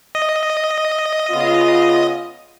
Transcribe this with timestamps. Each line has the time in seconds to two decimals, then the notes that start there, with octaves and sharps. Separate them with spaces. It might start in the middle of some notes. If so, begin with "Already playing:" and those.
0.15 D#5
1.31 C#3 B3 F4